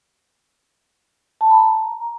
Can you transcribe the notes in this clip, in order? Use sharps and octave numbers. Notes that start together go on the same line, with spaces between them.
A5
B5
A#5